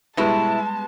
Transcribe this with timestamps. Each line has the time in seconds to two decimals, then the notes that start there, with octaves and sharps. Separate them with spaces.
0.17 B2 G3 G#3 B3 E4 A5